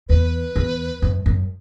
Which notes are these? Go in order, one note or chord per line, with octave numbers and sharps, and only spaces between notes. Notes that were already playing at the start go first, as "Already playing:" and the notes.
E2 B4
E2
F#2
F#2